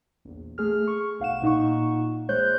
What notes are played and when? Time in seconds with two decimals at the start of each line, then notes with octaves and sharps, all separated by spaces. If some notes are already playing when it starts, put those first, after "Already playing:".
0.25 A#1 E2
0.58 A3 G#4 F6
0.87 C#6
1.20 B1 F5 F#5 E7
1.42 A#2 D#4 F#5 C#6
2.29 A#1 G#3 C5 C#5 F#6 G6